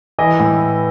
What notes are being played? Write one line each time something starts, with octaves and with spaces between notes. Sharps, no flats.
E3 D#5
A2